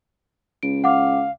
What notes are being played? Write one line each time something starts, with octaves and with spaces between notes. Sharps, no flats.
C#2 D7
F5 F#5 D6